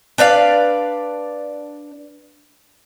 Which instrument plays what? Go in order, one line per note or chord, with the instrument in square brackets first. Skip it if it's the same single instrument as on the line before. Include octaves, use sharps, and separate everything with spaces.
[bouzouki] D4 B4 D5 F5